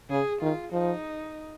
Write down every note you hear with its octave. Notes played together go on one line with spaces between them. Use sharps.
C#3 G#4
D#3 F4
F3 D#4